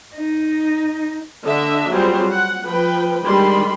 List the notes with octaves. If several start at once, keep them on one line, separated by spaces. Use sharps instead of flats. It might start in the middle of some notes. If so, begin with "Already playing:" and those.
D#4
D3 D4 D#5 E5
F#3 G3 C4 F4 G#4 C5
F#5
F3 B4 G5
D#3 G3 G#3 D4 B5 C6